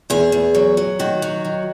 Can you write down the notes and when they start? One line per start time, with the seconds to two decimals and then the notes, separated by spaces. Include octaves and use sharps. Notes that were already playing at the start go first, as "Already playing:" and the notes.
0.10 E2 G#4
0.32 E2
0.55 F#3
0.77 F#3
0.99 D#3 F#4
1.22 F#3
1.45 D#3